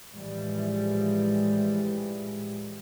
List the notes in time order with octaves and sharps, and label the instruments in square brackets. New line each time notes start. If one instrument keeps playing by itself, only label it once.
[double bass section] A2 E3 F3 G3 G#3